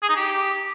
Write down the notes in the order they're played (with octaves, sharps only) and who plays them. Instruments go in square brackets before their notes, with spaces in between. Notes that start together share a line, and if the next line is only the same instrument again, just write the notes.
[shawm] G#4
D#4
G4